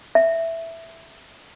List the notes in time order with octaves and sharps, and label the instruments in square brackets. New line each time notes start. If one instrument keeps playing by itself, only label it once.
[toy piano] E5